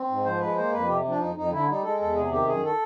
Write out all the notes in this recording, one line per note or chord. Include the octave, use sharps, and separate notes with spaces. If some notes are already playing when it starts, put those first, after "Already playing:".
Already playing: C4
G#2
F3 C5
G#3 B4
A#3 C5
F2 B4
C3 G4
F3 D4
F2 D#4
F2 D#4
D3 E4
G3 D#4
G#3 A4
E2 A4
C3 G#4
D#3 G4
F#2 G#4
A4